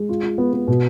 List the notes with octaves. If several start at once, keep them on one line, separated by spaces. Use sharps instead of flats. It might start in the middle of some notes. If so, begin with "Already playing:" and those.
Already playing: G#3
F4
F4
B3
B3
B2